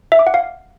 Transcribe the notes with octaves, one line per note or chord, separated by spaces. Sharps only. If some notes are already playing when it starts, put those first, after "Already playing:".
E5
D6
F#5
F5